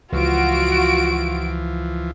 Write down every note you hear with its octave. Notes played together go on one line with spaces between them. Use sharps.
C#2 E3 F3 F4 F#4 D7